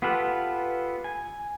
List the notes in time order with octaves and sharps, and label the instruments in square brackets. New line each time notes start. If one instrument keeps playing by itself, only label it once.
[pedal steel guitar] B3 F4 G4 A4 B4
G#5